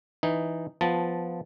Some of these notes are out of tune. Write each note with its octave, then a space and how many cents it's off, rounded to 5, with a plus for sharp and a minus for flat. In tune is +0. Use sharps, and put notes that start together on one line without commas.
E3 +0 D#4 +0
F3 +0 B3 +5 A5 +0